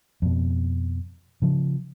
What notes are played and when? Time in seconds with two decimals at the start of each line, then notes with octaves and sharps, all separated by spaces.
0.22 F2 B2
1.42 C#3 F3